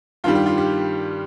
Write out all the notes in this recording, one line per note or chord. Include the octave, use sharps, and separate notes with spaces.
G2 D#3 G3 F4
G4
F4
G4